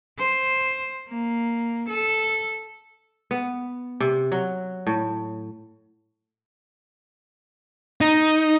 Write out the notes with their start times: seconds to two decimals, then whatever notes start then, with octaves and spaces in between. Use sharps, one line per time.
0.18 C5
1.09 A#3
1.89 A4
3.31 B3
4.00 C3
4.32 F#3
4.87 A2
8.01 D#4